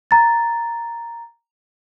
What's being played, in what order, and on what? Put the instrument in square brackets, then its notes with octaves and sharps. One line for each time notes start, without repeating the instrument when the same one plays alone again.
[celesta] A#5 A6